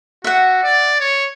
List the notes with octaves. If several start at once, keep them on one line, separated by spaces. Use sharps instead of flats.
F#4 E5 F#5
D5
C#5